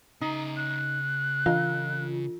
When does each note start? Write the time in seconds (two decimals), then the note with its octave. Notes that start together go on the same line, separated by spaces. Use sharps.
0.21 C#3 D#4 A#5
0.57 F#6
1.46 E3 F4 F5